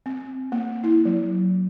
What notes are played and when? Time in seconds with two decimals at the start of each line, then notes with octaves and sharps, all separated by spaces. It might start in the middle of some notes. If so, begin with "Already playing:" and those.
0.06 C4
0.52 A#3
0.84 E4
1.05 F#3